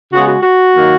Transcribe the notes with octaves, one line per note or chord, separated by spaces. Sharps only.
C#3 G#3 B3 F#4
F#4
F#4
D#3 F#3 A#3